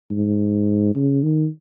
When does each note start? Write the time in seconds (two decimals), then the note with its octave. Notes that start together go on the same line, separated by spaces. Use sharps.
0.11 G#2
0.95 C#3
1.23 D#3